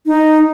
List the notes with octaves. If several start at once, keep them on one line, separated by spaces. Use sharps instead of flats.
D#4